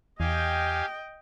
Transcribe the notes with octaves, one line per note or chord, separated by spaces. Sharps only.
E2 G4 D#5 F5 G5 G#5